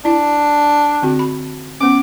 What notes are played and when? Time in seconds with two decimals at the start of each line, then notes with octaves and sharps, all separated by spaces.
0.05 D4 E4
1.02 D3 C4 F#4
1.19 B5
1.80 B3 C#4 D6